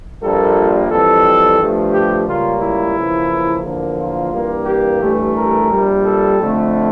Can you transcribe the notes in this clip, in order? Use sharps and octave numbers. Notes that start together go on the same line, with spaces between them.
A#1 A#2 G3 A#3 A4
F2 E3 G3 A4
G2 F3 A3
G4
C#2 C#3 G3 A#3 F4
E4
E2 C#3 F3 A#3
E2 D3 F3 A#3
F4
G2 E3 G3 A#3
G4
A1 G2 E3 A3
A#4
A#1 A#2 G3
A4
F2 D3 A3